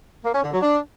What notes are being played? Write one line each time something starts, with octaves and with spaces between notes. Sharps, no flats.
A#3
C#4
D3
F#3
D4